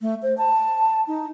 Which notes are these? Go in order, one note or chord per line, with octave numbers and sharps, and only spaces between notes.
A3
C5
A5
D#4